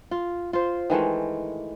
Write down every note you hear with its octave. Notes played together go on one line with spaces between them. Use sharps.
F4
F4 C5
D#3 E3 G#3 A3